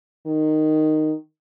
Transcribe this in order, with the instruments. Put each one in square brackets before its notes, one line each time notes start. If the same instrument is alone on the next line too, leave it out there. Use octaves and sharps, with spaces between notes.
[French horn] D#3